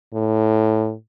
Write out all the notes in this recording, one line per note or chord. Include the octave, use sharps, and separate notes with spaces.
A2